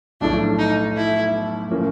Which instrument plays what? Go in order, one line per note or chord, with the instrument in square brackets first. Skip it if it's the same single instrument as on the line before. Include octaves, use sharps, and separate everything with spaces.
[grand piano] B1 A2 F3 A3 [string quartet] D4
[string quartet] D#4
E4
[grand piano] A2 F3 A#3 C#4